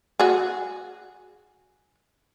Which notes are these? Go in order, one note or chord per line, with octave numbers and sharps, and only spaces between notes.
F#4 G#4